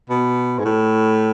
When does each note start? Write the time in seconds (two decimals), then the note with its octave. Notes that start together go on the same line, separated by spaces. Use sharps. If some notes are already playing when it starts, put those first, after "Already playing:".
0.10 B2
0.59 G#2
0.65 A2